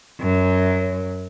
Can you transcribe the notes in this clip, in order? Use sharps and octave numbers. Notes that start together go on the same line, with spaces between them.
F#2